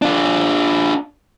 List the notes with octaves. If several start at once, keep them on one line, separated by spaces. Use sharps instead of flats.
D4 F4